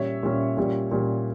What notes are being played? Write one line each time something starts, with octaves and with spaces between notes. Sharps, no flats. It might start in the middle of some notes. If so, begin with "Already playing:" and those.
Already playing: A#2 G3 C#4 C#5 E5
A#2 G3 C#4
A#2 G3 C#4
A#2 G3 C#4